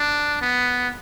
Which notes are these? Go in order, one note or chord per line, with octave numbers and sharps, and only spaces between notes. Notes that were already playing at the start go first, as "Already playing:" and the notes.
Already playing: D4
B3